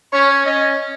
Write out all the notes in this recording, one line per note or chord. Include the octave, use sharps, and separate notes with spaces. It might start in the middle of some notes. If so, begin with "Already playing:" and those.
C#4 C#5
C#4 D#5